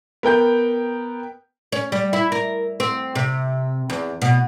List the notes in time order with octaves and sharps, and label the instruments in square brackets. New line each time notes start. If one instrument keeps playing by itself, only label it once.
[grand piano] B3 A#4 G5 G6
[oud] C#4
G3
E4
A#4
C4
C3
E2
B2